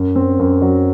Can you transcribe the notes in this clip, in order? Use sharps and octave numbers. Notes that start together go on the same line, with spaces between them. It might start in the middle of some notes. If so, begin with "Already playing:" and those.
Already playing: F#2
C4
F#2
F#3